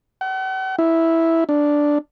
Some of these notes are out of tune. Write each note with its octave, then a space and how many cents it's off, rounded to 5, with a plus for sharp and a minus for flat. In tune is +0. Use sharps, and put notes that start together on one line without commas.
F#5 +45
E4 -5
D4 +0